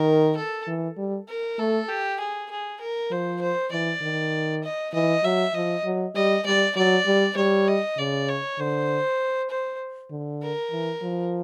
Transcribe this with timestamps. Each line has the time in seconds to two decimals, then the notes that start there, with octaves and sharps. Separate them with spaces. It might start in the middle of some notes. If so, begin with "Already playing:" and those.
Already playing: D#3 A#4
0.36 A4
0.68 E3
0.98 G3
1.28 A#4
1.59 A3 A4
1.89 G4
2.20 G#4
2.51 G#4
2.80 A#4
3.11 F3 C5
3.41 C5
3.72 E3 D5
4.02 D#3
4.64 D#5
4.94 E3 D#5
5.24 F#3 E5
5.54 F3 D#5
5.85 F#3
6.15 G3 D#5
6.45 G3 D5
6.76 F#3 D5
7.07 G3
7.37 G3 C#5
7.67 D#5
7.98 C#3 D5
8.29 C#5
8.59 D3 C5
9.50 C5
10.11 D3
10.42 A#4
10.72 E3
11.03 F3